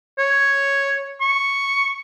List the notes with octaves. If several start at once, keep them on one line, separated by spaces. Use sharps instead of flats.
C#5
C#6